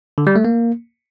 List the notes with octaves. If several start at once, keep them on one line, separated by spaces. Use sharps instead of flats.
D3
G3
A3
A#3